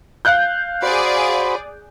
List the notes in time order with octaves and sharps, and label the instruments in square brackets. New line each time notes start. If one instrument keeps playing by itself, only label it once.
[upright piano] F5 F#6 G6
[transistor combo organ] F#4 C5 B5 [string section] G#4 D5